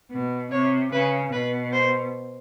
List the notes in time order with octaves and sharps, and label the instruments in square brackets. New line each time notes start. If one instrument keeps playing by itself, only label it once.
[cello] B2
[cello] C3 [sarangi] C#5
[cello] C#3 [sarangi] B4
[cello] B2 [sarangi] B4
[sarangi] C5